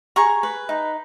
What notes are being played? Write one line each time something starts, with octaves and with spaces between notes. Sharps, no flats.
G#4 A#5 C#6
B4
D#4